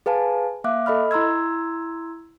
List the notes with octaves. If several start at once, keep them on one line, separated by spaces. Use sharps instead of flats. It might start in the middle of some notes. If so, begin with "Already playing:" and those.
G#4 B4 F5 G#5 A5
A#3 E5 F5 D6 F#6
A4 D#5 B5 F6
E4 A#5 C6 E6 G#6